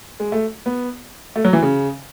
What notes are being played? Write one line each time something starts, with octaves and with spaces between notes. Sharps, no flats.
G#3
A3
B3
A3
F#3
E3
C#3